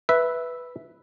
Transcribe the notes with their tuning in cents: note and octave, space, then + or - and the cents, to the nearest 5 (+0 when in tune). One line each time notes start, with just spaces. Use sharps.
B4 +0 E5 +0